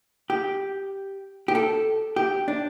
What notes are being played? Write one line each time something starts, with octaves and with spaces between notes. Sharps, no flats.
G4
G4
A4
G4
D4